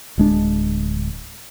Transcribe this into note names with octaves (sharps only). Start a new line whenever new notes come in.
D1 G#3 D4